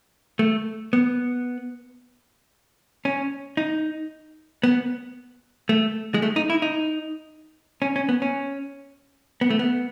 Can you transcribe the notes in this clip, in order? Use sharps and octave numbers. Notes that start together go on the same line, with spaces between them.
A3
B3
C#4
D#4
B3
A3
G#3
A3
D#4
E4
D#4
C#4
C#4
B3
C#4
B3
A3
B3